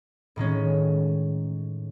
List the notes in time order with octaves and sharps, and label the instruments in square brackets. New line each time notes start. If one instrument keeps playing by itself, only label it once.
[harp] A2 D#3 G#3 C#4